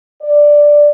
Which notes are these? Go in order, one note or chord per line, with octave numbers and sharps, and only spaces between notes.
D5